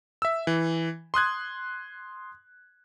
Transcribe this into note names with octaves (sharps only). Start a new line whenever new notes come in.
E5 E6
E3
C6 D#6 F#6 G#6